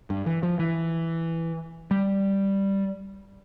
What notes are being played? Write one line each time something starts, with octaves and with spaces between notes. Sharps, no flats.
G2
E3
F3
E3
G3